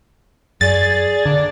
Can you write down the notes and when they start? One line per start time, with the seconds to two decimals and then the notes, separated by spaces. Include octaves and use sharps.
0.61 F#2 G#4 D5 A6
1.25 D3 A#3 D4